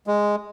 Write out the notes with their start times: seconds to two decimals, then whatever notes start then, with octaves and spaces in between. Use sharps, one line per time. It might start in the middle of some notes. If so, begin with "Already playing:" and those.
0.07 G#3